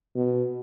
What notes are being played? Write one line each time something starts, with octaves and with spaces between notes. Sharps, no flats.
B2